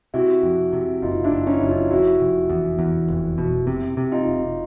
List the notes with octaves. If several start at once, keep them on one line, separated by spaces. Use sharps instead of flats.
C3 E4 F#4
F2
C3
F#1 D#4 F4
D4 E4
F#1
C#4 D#4
F#1 E4
D#4 F4
F1 E4 F#4
F1
E2
E2
F1
B2
C3
C3
D#4 F4
F1